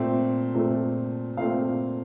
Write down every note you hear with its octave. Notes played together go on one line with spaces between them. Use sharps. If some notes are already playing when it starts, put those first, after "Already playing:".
Already playing: A#2 A3 C4
A#2 A3 C4
A#2 A3 C4 F5